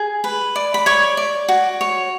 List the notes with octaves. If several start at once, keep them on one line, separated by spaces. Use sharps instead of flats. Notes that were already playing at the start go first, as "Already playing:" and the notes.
Already playing: G#4
B4
D5
B5
C#5 D5 C#6
D5
F#4
C#5